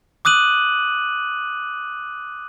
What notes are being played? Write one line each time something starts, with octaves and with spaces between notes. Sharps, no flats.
D6 D#6 F#6 D#7 F#7